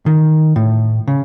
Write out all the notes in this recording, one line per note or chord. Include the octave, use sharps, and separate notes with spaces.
D#3
A2
C#3